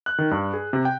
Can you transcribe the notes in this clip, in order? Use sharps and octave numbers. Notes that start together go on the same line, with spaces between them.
F#6
D#3
G2
G#4
C3
G5